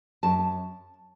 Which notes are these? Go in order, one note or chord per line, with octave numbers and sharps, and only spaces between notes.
F#2 A5